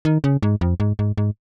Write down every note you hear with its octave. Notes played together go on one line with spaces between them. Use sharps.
D#3
C#3
G#2
F2
G#2
G#2
G#2